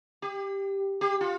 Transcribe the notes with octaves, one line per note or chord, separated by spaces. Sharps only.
G4
G4
F4